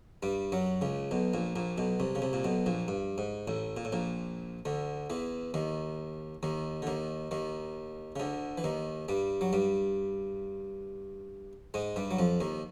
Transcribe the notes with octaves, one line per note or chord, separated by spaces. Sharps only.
G2 G3
F#2 F#3
C#2 C#3
B1 B2
A#1 A#2
A#1 A#2
B1 B2
C2 C3
C#3
C2 C3
A#2
B1 B2
A#1 A#2
G2
G#2
A1 A2
A#2
A2
A#1 A#2
D2 D3
E2 E3
D#2 D#3
D#2 D#3
D3
D#2 D#3
D#2 D#3
C#3
D2 D3
E3
D#2 D#3
G2 G3
F#3
G2 G3
G#2 G#3
G2 G3
F#3
F2 F3
D#2 D#3